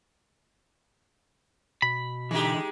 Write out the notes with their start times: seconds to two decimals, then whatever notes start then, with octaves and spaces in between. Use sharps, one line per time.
1.82 B2 B5
2.31 D3 E3 G#3 D#4 G4